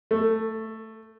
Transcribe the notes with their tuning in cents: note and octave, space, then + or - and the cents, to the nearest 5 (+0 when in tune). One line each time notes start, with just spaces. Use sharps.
A3 +10